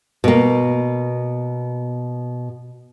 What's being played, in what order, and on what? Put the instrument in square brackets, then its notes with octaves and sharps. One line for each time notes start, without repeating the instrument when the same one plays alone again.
[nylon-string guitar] B2 A#3